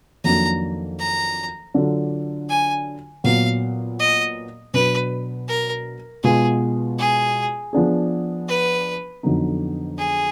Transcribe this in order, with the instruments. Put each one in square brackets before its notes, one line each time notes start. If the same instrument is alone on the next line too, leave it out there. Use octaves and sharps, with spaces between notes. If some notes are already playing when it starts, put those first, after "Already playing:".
[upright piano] F2 D#3 F#3 A#3 D4 [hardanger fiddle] A#5
[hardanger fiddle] A#5
[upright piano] D3 F#3 D4 F4
[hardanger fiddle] G#5
[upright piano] A#2 F#3 B3 [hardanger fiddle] F5
[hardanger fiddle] D#5
[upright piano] B2 F#3 D4 [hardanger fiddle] B4
[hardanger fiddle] A#4
[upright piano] B2 G#3 B3 F4 [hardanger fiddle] G#4
[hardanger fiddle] G#4
[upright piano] F3 B3 D4 G#4
[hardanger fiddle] B4
[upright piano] F2 D3 F#3 B3 D#4
[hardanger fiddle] G#4